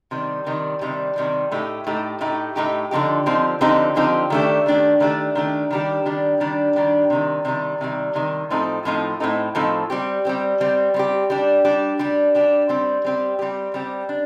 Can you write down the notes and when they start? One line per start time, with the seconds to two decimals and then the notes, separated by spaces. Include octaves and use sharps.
0.11 C3 D#3 G3
0.46 C3 D#3 G3
0.81 C3 D#3 G3
1.16 C3 D#3 G3
1.51 A2 A3 D#4 G4
1.87 A2 A3 D#4 G4
2.21 A2 A3 D#4 G4
2.56 A2 A3 D#4 G4
2.91 D3 F3 C4 D#4 G4
3.26 D3 F3 C4 D#4 G4
3.61 D3 F3 C4 D#4 G4
3.96 D3 F3 C4 D#4 G4
4.30 D#3 A3 D4 G4
4.66 D#3 A3 D4 G4
5.00 D#3 A3 D4 G4
5.35 D#3 A3 D4 G4
5.71 D#3 G3 D4 G4
6.06 D#3 G3 D4 G4
6.40 D#3 G3 D4 G4
6.76 D#3 G3 D4 G4
7.10 C3 D#3 G3
7.45 C3 D#3 G3
7.81 C3 D#3 G3
8.15 C3 D#3 G3
8.50 A2 F3 C4 D#4 A4
8.85 A2 F3 C4 D#4 A4
9.20 A2 F3 C4 D#4 A4
9.55 A2 F3 C4 D#4 A4
9.90 G3 C4 G4
10.25 G3 C4 G4
10.60 G3 C4 G4
10.94 G3 C4 G4
11.30 G3 D4 G4
11.65 G3 D4 G4
11.99 G3 D4 G4
12.35 G3 D4 G4
12.69 G3 C4 G4
13.04 G3 C4 G4
13.39 G3 C4 G4
13.74 G3 C4 G4
14.09 D4